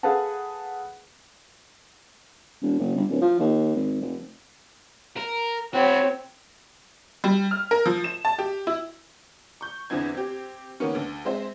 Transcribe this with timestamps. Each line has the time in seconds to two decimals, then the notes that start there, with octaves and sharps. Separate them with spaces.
0.03 G#4 A4 B4 F5 F#5 A5
2.62 E1
2.79 F#1
2.96 G1
3.10 D1
3.21 F3
3.40 D#2
3.75 G#1
4.01 F1
5.17 A#4
5.74 C4 E4 F#4 C#5
7.24 G3
7.51 F6
7.71 A#4
7.86 F3
8.04 E7
8.25 A5
8.39 G4
8.67 E4
9.61 C#6 G6
9.90 E2 D3 E3 B3 C4 G#6
10.15 C4 G4
10.80 D#3 A#3 B3 C#4
10.95 D2
11.25 G#3 C4 C5 E5